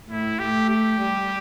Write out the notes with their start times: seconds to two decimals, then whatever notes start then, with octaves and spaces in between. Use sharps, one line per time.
0.09 A2 E4
0.39 A3 G4
0.69 G4
1.00 G3